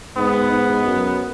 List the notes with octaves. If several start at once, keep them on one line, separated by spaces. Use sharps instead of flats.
G#2 B3
G#2
F#2